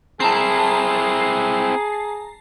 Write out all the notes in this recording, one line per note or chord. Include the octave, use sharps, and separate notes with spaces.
C4 E4 G#4 A5 A#5 C7